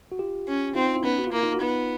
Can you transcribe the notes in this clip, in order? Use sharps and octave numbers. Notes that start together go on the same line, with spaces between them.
F#4
F4 G4
C#4
C4 D#4 F4
E4
B3 C#4 D#4
F#4
F4
A#3 E4
D#4 F4
F#4
B3 D#4 F4